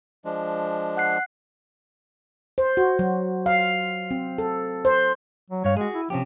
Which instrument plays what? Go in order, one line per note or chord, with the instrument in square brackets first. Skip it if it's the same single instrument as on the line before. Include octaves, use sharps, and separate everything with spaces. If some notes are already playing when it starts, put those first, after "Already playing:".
[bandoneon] F3 G#3 D4
[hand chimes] F#5 F#6 C7
[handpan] C5
F#4
F#3
F5
C4
A4
C5
[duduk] F#3
[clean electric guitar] G2 F5 [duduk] C#5
[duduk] G#3 [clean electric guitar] F#4 G#4
[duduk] E4
[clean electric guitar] C3 C#4 G4 [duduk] F3